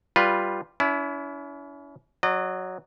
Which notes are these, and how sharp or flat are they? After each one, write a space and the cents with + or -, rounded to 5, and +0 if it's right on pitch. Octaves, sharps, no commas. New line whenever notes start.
G3 +0 F4 +0 B4 +0
C#4 +40 E4 +0
F#3 +0 D#5 -40